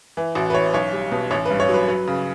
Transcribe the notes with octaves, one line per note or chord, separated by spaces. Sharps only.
E3
A1 F#4
B4
E3 C#5
B1 C#5
G3
B2
A1 C#5
B4
G2
C#5
F#3
B4
F#3 B4
C#3